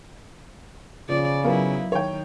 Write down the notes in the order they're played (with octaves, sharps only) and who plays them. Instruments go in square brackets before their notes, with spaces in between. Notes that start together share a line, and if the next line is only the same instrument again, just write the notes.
[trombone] C#3 [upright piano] F3 [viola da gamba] D5
[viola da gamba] F#3 E4 [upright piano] B3 F4 A#4
[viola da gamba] D#3 [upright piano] C#5 G5